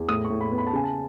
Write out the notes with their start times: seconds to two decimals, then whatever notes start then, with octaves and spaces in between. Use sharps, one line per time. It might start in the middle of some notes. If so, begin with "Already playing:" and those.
Already playing: E2
0.08 A2 D#6
0.25 C#6
0.30 A2
0.41 B5
0.52 B3
0.58 B5
0.67 A5
0.73 C#3 G#5
0.84 A5